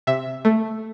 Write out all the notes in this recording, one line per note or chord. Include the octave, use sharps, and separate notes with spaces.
C3 E5
A3